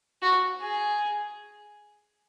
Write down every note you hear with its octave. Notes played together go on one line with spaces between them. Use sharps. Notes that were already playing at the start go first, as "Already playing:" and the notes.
F#4
G#4